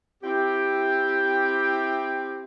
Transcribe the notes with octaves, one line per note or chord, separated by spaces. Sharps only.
C4 E4 G4